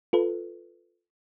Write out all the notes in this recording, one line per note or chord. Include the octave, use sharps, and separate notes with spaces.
F4 A4 B4